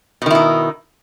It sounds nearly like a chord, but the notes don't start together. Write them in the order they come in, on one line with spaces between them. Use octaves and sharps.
B2 D#3 E4 D#4